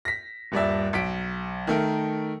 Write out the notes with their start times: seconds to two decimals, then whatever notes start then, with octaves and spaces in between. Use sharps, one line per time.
0.05 A#6 B6
0.52 D#1 G2 D5 E5
0.93 B1 B6 D7
1.67 D#3 A3 A#4